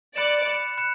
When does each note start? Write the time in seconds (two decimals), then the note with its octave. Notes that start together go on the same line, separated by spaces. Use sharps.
0.16 D5 B5 F#6 C#7 E7
0.46 B5 F#6 C#7 E7
0.78 B5 F#6 C#7 E7